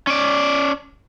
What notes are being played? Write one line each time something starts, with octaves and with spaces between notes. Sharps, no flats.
C#4 D5